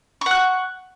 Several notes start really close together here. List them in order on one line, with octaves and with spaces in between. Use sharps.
C#6 F#5 F#6